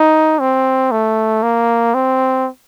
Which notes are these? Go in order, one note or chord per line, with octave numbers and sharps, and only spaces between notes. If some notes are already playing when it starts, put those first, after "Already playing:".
Already playing: D#4
C4
A3
A#3
C4